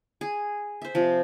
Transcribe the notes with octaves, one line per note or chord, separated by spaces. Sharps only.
G#4
C5 E5
C3 F3